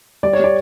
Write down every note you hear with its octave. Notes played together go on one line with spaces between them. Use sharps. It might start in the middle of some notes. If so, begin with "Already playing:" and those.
G3 D5
C#5
G3 D5